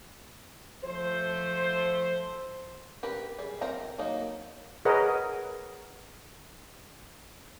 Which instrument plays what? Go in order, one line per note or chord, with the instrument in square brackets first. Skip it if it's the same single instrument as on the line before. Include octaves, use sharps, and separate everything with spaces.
[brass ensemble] F3 A3 C5
[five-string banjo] G4 A#4 B4
G3 G#4
C4 F#4 A#4 G5 A#5
F#3 A#3 D#4
[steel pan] G#4 A#4 B4 C#5 D#5 F#5